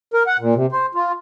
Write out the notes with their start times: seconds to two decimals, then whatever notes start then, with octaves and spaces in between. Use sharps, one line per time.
0.14 A#4
0.27 F#5
0.39 A#2
0.55 C3
0.72 C5
0.95 F4